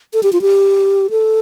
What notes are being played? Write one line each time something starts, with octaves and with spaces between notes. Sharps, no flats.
A4
G4
F4
G4
A4